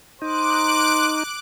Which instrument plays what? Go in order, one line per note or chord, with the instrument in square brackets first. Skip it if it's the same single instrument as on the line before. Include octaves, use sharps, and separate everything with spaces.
[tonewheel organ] D#4 [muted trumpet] C5 [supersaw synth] D6 F#6 D7